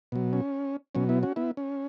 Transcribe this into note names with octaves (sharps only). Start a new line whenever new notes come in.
B2 F#3
C#4
B2 F#3 C#4
B3 E4
C#4 F#4
B3 E4
C#4